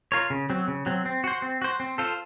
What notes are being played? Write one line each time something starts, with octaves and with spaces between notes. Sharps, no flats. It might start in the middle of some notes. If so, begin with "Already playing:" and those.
F4 A#4 C#5
C#3
F#3 C4
C#3
F#3 C4
C4
F#4 C5
C4
F#4 C5
C4
F4 A4 C5